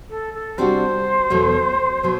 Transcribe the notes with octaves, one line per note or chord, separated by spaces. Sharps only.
A4
A4
C3 G3 D4 F#4 C5
E2 B2 F#3 A3
B2 F#3